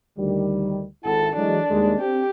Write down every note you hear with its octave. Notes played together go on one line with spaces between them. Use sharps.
D2 D#3 G3
G#1 E4 A4 F#5
E3 F#3 G#3 D4
D#2 G3 G#3
C4 G4